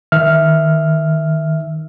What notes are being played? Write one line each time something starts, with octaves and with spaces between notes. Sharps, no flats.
D#3 E5 F6